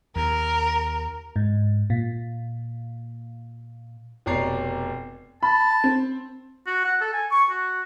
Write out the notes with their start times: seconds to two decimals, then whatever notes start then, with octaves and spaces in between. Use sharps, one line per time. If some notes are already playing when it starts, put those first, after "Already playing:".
0.16 D#2 A#4
1.36 G#2
1.90 A#2
4.26 F1 B2 C#5 D5 A#5 C7
5.43 A5 B5
5.84 C4
6.67 F#4
6.84 F#5
7.01 A4
7.13 G#5
7.31 C#6
7.50 F#4